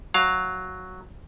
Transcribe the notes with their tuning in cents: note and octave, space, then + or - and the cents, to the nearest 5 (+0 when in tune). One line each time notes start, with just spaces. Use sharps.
F#3 +0 F5 +0